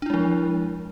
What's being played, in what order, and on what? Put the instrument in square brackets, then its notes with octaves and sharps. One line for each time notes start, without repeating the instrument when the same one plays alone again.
[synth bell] D4
E4
G#3
F3